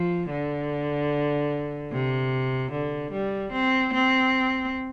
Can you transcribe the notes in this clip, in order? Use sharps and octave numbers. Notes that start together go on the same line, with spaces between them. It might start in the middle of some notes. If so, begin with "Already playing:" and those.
Already playing: F3
D3
C3
D3
G3
C4
C4